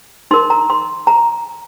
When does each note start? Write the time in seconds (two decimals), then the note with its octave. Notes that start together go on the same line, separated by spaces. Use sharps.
0.31 D#4 A#4 C6
0.50 A#5
0.70 C6
1.07 A#5